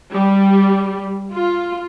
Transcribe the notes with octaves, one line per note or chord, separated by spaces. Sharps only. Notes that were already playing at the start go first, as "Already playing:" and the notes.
G3
F4